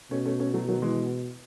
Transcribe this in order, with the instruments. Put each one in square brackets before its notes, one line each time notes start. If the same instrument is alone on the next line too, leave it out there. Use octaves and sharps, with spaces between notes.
[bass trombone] B2 [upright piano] A3 C#4
[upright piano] A3 C#4
A3 C#4
F#3 A3
D#3 F#3
E3 G#3